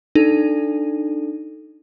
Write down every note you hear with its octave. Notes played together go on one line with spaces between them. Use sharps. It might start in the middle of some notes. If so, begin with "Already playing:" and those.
D4 D#4 A4